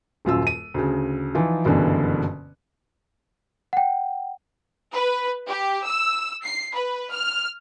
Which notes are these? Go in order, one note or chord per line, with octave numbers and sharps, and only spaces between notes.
D#1 F#2 F4 E6
D#7
D2 C#3
E3 F3 D#4 F4
F#1 G2 B2 D3 E3
F#5 G5
B4
G4
E6
C7
B4
F6